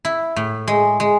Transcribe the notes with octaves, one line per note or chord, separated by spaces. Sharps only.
E4
A2
G#3
G#3